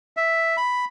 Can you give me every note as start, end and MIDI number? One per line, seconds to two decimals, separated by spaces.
0.17 0.57 76
0.57 0.85 83